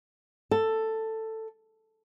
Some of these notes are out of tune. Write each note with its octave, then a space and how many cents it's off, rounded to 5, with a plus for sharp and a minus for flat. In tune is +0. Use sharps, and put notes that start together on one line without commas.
A4 +10